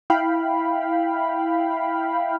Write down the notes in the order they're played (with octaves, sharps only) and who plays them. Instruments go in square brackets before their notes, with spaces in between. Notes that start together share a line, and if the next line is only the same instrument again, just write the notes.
[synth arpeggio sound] E4 F5 G5 B5